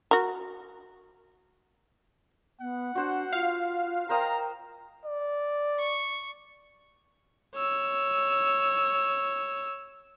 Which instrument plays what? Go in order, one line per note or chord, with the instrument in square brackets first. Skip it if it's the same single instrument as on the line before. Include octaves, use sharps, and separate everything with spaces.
[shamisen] F#4 A#4
[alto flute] B3 [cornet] F#5
[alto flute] D4 [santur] F#4 C5
[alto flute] F4 [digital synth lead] F5
[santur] A#4 C5 D#5 [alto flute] G5 [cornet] A#5
[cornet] D5
[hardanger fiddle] C#6
[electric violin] C#5 E6